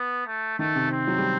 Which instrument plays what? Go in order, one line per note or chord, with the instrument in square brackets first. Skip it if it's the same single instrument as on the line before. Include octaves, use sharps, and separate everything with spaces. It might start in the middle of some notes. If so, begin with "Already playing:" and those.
Already playing: [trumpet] B3
A3
[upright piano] D#3 [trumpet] A3
[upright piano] C3
[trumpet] C4
[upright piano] F#3
G3